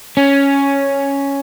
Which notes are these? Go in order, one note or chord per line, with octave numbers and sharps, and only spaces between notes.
C#4